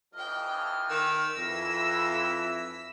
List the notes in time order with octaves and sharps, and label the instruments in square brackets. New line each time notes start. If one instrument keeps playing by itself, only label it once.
[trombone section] F2 E3 F3 [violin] D#5 G5 [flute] F6
[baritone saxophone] D#3 [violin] E6 B6
[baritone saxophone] F2 [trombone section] E3 E4 [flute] A#6